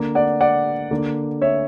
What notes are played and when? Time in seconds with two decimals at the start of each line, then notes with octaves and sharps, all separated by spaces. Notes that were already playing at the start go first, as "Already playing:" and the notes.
Already playing: D3 A#3
0.15 D5 F#5
0.41 D5 F#5
0.91 D3 A#3
1.42 C#5 E5